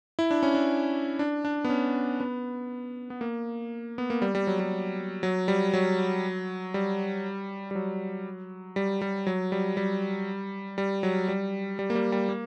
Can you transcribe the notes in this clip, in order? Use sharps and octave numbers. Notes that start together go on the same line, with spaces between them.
E4
D4
C#4
D4
D4
D4
B3
C#4
B3
B3
A#3
B3
A#3
G3
G3
F#3
G3
F#3
G3
F#3
G3
G3
F#3
G3
G3
F#3
G3
G3
G3
F#3
G3
G3
A#3
G3
G3
A#3